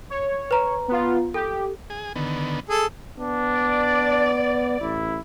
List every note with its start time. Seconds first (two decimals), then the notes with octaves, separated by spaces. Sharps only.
0.10 C#5
0.51 B4 A#5
0.88 B3 F4
1.34 G4 A4
1.90 G#4
2.16 D3 D#3 B3
2.69 G#4 A4
3.18 B3 D4
3.55 D5
4.81 A1 E4